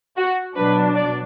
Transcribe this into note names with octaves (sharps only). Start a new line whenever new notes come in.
F#4
B2 F#3 D4 B4
D5